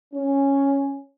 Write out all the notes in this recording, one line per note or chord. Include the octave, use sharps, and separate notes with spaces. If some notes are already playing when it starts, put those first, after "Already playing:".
C#4